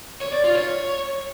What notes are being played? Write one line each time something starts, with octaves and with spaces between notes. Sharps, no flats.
C#5
D5
F4
C#5